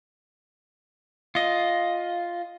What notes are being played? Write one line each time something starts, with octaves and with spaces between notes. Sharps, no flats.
F4 D#5